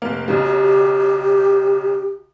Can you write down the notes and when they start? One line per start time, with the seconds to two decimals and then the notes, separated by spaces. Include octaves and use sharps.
0.02 F1 A#3
0.28 B1 C#3 G3
0.45 G4